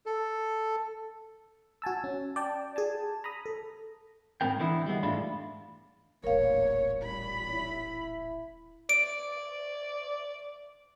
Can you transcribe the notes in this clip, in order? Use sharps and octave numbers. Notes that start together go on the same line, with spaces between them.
A4
F#4 G#5 A5 E6
C#4
D5 G5 A5
G#4 G#5 A5
A#5 B5 D#6
A4
G#2 B3 C4 A#4 G5
D3 E3 B3 E4
G3 G#3 B3
G#2 E3 A3 D4 F4 B5
D#1 A1 E2 A#3 A#4 C#5 F5
A#2 G3 C#5 B5
E4
D5 D7